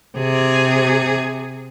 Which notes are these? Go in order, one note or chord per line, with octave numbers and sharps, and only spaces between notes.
C3 G#4